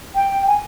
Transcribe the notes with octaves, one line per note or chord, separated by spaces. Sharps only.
G5
G#5